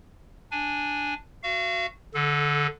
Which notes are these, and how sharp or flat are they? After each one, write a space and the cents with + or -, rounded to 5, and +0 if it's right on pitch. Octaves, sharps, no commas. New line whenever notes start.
D4 +0 G#5 +0
F#4 +0 F5 -40
D3 +0 A4 -25